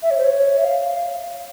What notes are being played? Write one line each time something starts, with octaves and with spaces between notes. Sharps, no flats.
E5
C#5
C5
C#5
E5
F5